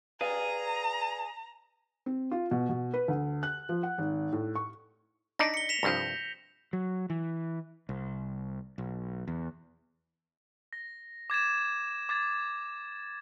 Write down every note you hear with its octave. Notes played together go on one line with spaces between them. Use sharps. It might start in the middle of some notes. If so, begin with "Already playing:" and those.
G#4 B4 D5 F5 A#5
C4
F4
B2
B2
B4
D2
F#6
F3
F#5
G#1
A2
C#6
D4 D#4 D5 A#6 B6
C#7 G7
B6 E7 F7
C2 G2 F3 G6 A#6
F#3
E3
C2
B1
E2
A#6
D6 G#6 A6 E7
D6 G#6 A6